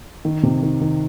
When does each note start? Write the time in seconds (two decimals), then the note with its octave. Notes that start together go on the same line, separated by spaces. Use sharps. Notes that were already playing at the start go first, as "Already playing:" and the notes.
0.25 D#3
0.43 C3
0.63 D#3
0.81 D#3